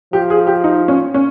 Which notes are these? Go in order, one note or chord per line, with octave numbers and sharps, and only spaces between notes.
F3 G4
G#4
G4
D#4
C#4
C#4